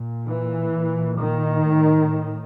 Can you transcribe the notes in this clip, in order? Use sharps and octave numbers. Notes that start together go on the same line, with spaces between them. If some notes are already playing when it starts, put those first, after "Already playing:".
Already playing: A#2
E3
A#2
D#3
A2